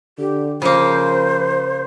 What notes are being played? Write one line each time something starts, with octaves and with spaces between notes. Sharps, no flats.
D3 G4
C#3 F3 A#3 C5